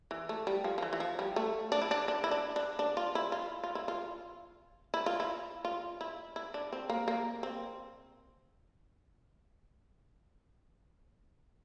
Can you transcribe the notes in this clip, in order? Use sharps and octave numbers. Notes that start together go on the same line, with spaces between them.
E3
A3
G3
F3
F3
E3
E3
F3
G3
A3
D4
E4
D4
D4
E4
D4
D4
D4
F4
E4
F4
F4
E4
F4
E4
F4
E4
F4
E4
E4
D4
C4
A#3
A#3
C4